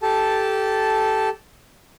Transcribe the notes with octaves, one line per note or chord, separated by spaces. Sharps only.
G4 A4 A5